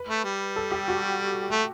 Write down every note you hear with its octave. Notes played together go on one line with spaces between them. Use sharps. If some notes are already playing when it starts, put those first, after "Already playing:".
Already playing: B4
A3
G3
A4
G4
F#4
A3